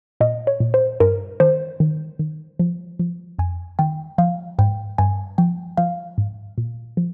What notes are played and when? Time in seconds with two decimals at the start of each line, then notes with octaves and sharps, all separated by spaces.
0.21 A#2 D#5
0.47 C#5
0.60 A#2
0.74 C5
1.00 G2 A#4
1.40 D#3 C5
1.80 D#3
2.19 D#3
2.59 F3
2.99 F3
3.39 F2 G#5
3.79 D#3 G5
4.18 F3 F5
4.59 G#2 G5
4.98 G2 G#5
5.38 F3 G5
5.77 F3 F5
6.18 G#2
6.58 A#2
6.97 F3